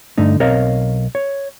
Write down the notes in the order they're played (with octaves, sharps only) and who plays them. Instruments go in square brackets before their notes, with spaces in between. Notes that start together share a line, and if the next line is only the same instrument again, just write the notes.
[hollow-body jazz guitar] G2 D3 A3 D#4
B1 C4 A#4 C#5 D#5 F5
C#5